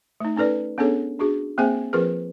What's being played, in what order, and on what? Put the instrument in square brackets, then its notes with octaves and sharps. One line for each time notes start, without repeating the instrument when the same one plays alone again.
[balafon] A3 D#4
C#4 D#4 A4 B4 D5
B3 C#4 D4 G#4 A4 C#5
D4 F#4 G#4
A#3 C4 G#4 C5 E5 G#5
F3 C4 F4 G#4 A#4 B4